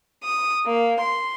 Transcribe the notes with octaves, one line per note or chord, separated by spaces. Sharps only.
D#6
A#3
C6